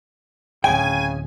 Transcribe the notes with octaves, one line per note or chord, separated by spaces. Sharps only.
D1 G1 C#3 G5 G#5